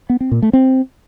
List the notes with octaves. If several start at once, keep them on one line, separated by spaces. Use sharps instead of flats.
B3
C4
A#2
A3
C4